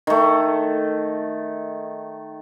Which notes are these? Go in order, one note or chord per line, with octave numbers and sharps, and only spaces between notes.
D#3 A3